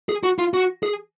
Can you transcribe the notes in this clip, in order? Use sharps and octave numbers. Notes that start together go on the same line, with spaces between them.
G#4
F#4
F4
F#4
G#4